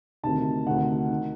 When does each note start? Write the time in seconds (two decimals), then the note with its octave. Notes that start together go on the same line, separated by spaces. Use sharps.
0.23 D2 C3 D#3 A5
0.67 D2 C3 D#3 F#5
1.10 D#3